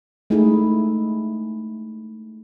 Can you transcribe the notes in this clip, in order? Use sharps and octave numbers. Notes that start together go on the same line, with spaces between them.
G#3 A3 D#4 E4 G#4